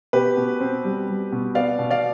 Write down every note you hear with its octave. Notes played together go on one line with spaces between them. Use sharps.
B2 G4 B4
B2
C4
G3
G3
B2
B3 D5 F5
B2
D5 F5